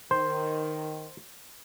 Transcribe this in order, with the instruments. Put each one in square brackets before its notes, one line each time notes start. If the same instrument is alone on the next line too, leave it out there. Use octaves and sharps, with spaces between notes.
[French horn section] D#3 [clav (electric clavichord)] C5